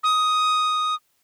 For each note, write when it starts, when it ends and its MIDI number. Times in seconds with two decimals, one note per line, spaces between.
0.03 0.95 87